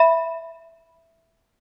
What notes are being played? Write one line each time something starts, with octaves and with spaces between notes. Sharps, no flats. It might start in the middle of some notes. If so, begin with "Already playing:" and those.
Already playing: E5 B5